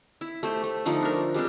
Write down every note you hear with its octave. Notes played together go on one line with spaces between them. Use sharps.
E4
A3 G4 C5
A3
D3 F3 A3 D#4
D4 A#4
G3 G#3 C4 D4